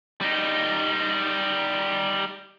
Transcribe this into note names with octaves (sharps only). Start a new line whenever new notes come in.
G3 D#4